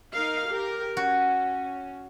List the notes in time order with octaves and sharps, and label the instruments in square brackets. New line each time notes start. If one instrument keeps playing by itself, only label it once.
[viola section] D#4 A#4 F5
G4 A#4
[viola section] C#4 [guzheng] F#4